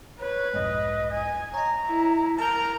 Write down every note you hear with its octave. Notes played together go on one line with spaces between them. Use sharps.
B4 C#5
B1 F2 G#2 D#5
G#5
C#5 D#5 A#5
E4
A#4 A5 A#5 F6 G6